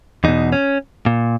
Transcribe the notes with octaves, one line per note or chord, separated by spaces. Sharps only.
E2 B2 D#4
C#4
A#2